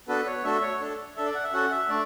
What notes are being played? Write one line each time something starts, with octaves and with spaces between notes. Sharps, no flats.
B3 D4 F#4 A4 B4
C#5
A3 D4 F#4 A4 E5
C#5
D4 A4
D4 A4 E5
D5
F#5
E5
C#4 F#4 A4 F#5
E5
A3 D4 D5